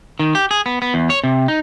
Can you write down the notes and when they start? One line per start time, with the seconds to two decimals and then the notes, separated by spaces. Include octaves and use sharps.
0.19 D#3
0.35 G4
0.51 G#4
0.66 B3
0.82 B3
0.94 E2
1.10 C#5
1.24 C3
1.48 D#4